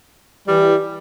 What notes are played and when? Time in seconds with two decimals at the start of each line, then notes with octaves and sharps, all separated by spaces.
0.48 E3 G3